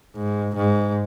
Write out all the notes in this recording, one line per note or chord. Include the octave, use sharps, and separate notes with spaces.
G#2
G#2